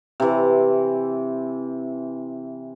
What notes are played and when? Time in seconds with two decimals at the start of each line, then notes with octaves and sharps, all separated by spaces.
0.20 C3 E3